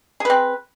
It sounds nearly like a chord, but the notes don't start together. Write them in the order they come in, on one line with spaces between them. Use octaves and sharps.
G#4 B4 C4